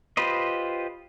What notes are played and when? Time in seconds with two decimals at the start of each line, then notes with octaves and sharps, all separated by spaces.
0.17 F4 G4 B4 C5 D#5